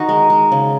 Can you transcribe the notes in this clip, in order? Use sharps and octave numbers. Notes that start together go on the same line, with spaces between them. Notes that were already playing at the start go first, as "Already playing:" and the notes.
Already playing: D#3 D#4 F#4
G#3
G#3
C#3